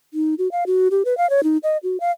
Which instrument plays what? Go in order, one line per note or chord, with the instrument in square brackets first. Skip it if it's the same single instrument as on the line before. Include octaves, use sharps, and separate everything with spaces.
[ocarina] D#4
F#4
F5
F#4
G4
B4
F5
C#5
D#4
D#5
F#4
F5